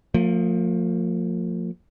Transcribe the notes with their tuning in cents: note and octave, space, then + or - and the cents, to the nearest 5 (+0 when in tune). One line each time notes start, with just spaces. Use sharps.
F3 +25 A#3 -45